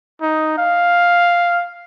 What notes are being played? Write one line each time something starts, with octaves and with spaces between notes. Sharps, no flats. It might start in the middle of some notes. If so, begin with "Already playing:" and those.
D#4
F5